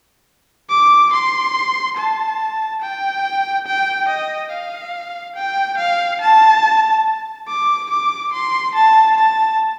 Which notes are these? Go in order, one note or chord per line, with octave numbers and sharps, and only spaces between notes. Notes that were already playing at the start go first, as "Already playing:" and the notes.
D6
C6
A5
G5
G5
D#5
F5
G5
F5
A5
D6
D6
C6
A5
A5